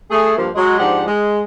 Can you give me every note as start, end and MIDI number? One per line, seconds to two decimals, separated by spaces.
0.11 0.36 57
0.11 0.36 68
0.37 0.49 43
0.37 0.49 53
0.37 0.49 58
0.55 0.75 54
0.55 0.75 56
0.78 1.06 44
0.78 1.06 53
0.78 1.06 62
0.78 1.06 67
0.78 1.06 78
1.06 1.41 56